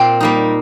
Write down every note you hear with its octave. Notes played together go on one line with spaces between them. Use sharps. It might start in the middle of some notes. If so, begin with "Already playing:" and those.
Already playing: A#2 C4 F4 G5
G3 A#3 D#4